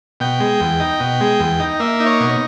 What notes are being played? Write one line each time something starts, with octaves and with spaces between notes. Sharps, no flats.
B2 G5
G#3
E2
D#4
B2
G#3
E2
D#4
A#3 E5
D#4
C#5
B2